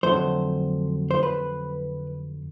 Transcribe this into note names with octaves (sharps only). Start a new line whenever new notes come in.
F2 D3 F#3 A3 C5
C5
B4